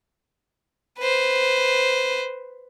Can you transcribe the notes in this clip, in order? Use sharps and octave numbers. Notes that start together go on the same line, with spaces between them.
B4 C5